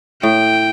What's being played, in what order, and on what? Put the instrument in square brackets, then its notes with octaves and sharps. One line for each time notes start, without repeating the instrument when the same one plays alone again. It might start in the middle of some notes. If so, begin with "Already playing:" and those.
[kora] A2 [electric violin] G5